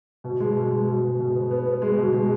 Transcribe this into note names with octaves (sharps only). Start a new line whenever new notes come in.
B2
G#3
B2
G#3
B2
B2
B2
B3
B3
B3
G#3
B2
G#3